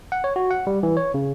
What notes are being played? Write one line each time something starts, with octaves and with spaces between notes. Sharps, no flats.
F#5
C#5
F#4
F#5
G3
E3
C#5
C#3